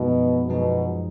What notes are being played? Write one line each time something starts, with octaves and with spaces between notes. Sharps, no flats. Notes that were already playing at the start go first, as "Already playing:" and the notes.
Already playing: F#2 B2 F3 G#3 D#4
F#2 B2 F3 G#3 D#4